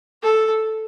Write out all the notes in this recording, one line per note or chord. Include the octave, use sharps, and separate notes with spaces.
A4